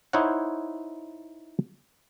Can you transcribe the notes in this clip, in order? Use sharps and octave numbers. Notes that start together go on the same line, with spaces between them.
D#4 E4 C5 C#5 F#5